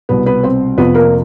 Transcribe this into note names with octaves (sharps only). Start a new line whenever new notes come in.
C2 B2 B3 B4
B3 B4
C4 C5
F2 C3 F3 B3 B4
A#3 A#4